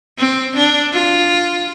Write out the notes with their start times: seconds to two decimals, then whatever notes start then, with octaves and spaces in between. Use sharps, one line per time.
0.18 C4
0.57 D4
0.92 F4